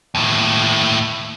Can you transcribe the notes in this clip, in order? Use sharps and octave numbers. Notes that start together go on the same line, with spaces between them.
D#2 A2